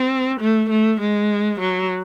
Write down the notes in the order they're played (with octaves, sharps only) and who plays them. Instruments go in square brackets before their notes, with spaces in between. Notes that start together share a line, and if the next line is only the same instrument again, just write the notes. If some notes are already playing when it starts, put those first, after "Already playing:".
Already playing: [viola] C4
A3
A3
G#3
F#3